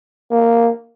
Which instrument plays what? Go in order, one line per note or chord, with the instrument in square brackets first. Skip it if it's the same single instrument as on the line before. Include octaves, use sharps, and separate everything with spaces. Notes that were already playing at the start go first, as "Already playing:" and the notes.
[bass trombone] A#3